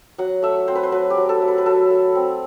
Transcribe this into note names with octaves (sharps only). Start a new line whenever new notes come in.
F#3 F#5
A3 E5
C4 C5
B4
C5
F#3 B4
G4
F#3
A4
A3
B4
B4
F#3 A4
A3
C4